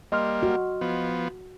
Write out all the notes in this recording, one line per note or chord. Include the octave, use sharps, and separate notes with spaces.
G3 A#3 D#5 C6 F6
F#4
F3 B3